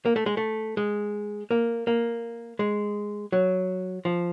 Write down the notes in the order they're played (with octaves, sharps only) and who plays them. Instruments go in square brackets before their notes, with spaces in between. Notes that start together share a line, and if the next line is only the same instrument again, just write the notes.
[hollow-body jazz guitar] A#3
A3
G#3
A3
G#3
A#3
A#3
G#3
F#3
F3